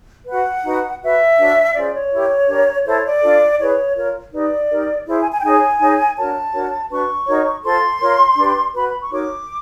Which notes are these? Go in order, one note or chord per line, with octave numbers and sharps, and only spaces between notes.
F#4 B4 F#5
D#4 F#4 B4
F#4 B4 E5
D4 F#4 A#4 C#5
C#4 F4 G#4 C5 D5
C#5
E4 G4 A#4
D4 G4 A#4
E4 A4 C5 C#5
D5
D4 F4 A4
E4 G#4 B4 C#5
F4 A#4 C#5
D#4 G4 B4 D5
D#4 G4 A#4
E4 G#4 C5
G#5
G#5
G5
D#4 G#4 C#5 G#5
D#4 G#4 C#5
D4 F#4 A#4 C#5 A5
D4 F#4 A#4 C#5
D4 F#4 B4 C#6
D#4 F#4 A#4 C#5
F4 A4 C5 C6
F4 A#4 C#5
D4 G4 B4
F#4 B4 B5
B5
C#6
D#4 F#4 A#4 C#5 D6